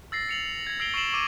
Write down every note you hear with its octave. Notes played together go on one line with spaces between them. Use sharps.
E6 A6 A#6 C7
C#7 F7 F#7
G#6 A#6
E6 A#6 C7 D7 F7 G7
C#6 E6 C7 D7 E7 F#7
C#6 D6 D#7